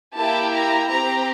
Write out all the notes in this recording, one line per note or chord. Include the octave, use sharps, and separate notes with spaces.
A#3 E4 G4 A5
A#5
C4 G4 A#5